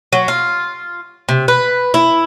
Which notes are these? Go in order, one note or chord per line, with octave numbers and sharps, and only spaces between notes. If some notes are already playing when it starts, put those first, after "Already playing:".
F#3
F4
C3
B4
E4